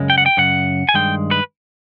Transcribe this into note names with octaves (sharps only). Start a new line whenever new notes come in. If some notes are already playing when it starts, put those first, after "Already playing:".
Already playing: F#2 C#3 G#3
G5
F#5
G5
F#2 C#3 F#5
G#5
G2 D#3 G#3 G5
B4